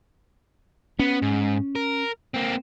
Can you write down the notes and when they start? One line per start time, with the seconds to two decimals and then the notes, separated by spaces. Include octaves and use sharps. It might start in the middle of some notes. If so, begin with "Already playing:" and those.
0.99 B3 C#4
1.22 G#2
1.75 A#4
2.34 A#3 C4